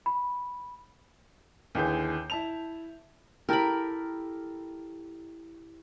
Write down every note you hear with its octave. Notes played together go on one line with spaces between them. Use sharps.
B5
D#2 D3 E3 G#4 G6
E4 A5 F7
E4 G4 A4 A#4 B5